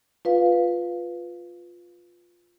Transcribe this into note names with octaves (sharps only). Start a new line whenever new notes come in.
F4 B4 F5